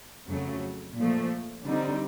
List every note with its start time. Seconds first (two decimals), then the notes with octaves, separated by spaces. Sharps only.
0.28 F2 C#3 F#3 A3
0.97 A#2 F3 A3
1.66 D3 G3 C4 D#4